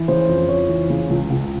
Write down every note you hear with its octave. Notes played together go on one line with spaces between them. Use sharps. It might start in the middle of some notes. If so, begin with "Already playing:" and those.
Already playing: E3
C#3 C5
F2
F2 C#5
E3
C#3
C#2
C#2